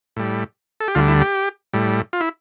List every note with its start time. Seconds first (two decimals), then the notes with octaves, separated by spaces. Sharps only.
0.17 A2 G3
0.81 A4
0.88 G4
0.95 D2 D3 G3 F4
1.08 E4
1.21 G4
1.74 A2 G3
2.13 F4
2.21 E4